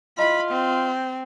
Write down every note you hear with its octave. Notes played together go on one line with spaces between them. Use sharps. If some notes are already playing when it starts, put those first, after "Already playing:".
E4 F4 G#4 D#5 B5
C4